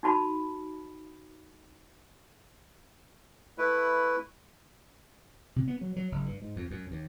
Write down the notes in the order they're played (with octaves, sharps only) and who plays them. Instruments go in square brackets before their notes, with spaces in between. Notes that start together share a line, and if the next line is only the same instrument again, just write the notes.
[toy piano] D#4 F#4 A5 B5
[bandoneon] A3 E4 B4
[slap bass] C3
B3
F#3
F#3
F#1
G2
G#2
F2
F#2
D#2